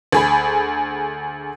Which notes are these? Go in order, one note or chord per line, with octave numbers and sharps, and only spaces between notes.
D2 G#4 B5